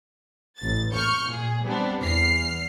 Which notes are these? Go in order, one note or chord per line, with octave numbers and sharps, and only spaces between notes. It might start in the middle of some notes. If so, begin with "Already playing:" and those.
A1 A6
C#6 F6 G6 C#7
A#2 G#4
G3 B3 C4 D4
E2 F6 C7